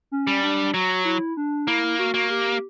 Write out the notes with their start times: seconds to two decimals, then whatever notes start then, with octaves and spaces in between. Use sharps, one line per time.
0.12 C#4
0.27 G3
0.43 D4
0.74 F#3 F#4
1.05 E4
1.37 D4
1.68 A#3 E4
1.99 F#4
2.14 A#3
2.30 G4